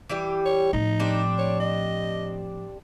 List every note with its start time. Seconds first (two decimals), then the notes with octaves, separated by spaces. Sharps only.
0.10 E3 G3 G4
0.46 C#5
0.73 A2 F3 D#4
1.00 G3 C4 D4
1.38 C#5
1.60 D#5